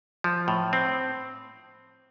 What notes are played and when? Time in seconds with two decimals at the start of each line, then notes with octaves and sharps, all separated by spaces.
0.24 F3
0.48 A2
0.73 C4